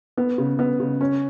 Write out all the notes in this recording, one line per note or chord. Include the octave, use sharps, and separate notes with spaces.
B3
C#3
B3
C#3
C#4